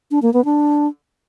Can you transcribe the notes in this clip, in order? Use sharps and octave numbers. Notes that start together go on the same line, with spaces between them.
D4
A#3
B3
D4